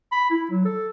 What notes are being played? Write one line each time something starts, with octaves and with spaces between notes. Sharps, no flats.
B5
E4
F#3
A4